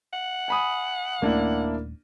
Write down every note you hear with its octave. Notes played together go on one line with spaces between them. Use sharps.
F#5
G#5 B5 D#6
D#1 A3 A#3 C#4 D4 E4